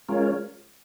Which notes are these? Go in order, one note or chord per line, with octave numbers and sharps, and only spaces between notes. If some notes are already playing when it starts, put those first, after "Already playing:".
G#3 C#4 F4 A#4 C#5